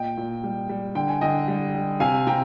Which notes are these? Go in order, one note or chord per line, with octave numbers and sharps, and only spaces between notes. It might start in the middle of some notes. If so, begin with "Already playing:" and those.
Already playing: A#2 D#5 G5
A#2
G3
G3
D3 G5
G#5
D3 D#5 G5
G3
G3
C3 F5 G#5
C3 G5 A#5